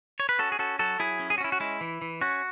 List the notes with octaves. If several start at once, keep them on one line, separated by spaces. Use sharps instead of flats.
C#5
B4
C#4 F#4 A4
G#4
C#4 F#4 A4
F#3 F#4 A4
F#3 E4 G#4
C#4
G#4
F#4
C#4 E4
F#4
G#3 E4
E3
E3
C#4 F#4